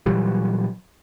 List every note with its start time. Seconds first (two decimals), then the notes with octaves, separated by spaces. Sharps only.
0.06 A#2 E3 F#3 G3